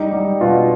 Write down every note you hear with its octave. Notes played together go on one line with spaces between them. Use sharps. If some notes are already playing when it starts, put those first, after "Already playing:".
Already playing: G3 D#4
G3
B2 F4